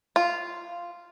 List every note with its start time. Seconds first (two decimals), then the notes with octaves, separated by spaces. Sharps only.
0.16 F4